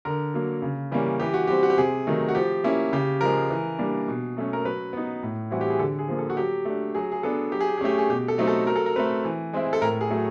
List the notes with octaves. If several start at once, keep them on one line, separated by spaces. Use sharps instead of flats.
D3 A#4
F#3 A#3
C#3
E3 G3 A#3 C#4
E3 G4
F#4
G3 C4 G4
F#4
G4
C3 G#4
D#3 F#3 A3
F#4
F3 G4
A#3 C#4 E4
C#3 G4
F3 G#3 A#4
E3
G3 A#3 D4
B2
F#3 A3 C#4
A#4
F#3 B4
B3 D#4
A2
E3 G3 C4 E4 F#4
G4
G#4
D3 A4
G#4
F3 A#3
A4
F#4
F#3 G4
A3 D4
F#3 G#4
G#4
B3 D4 A4
F#3 G4
G#4
G4
G#4
A3 C#4 G4
G#4
B2 G4
A4
F#3 A3 C4 D#4
A4
F#3 A#4
A4
A#4
A3 C4 B4
E3
G#3 C4 E4
A4
A2 A#4
G#4
F#3 A3